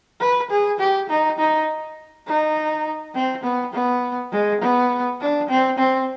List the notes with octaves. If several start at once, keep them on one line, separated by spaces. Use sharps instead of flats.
B4
G#4
G4
D#4
D#4
D#4
C4
B3
B3
G#3
B3
D4
C4
C4